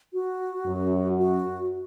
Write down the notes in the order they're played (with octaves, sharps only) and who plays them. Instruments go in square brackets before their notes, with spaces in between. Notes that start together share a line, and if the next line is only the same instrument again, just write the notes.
[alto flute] F#4
[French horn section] F#2
[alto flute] F#4